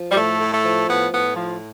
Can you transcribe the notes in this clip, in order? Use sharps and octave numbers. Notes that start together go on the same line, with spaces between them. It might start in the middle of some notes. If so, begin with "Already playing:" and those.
Already playing: F3
G3
A2 A3
A2
A3
F3
A2 B3
A2 B3
F3